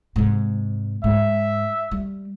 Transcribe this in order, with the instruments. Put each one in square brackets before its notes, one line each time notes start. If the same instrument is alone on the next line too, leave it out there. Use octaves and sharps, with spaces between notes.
[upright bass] G#2 C3
[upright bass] G#2 [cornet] E5
[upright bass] G3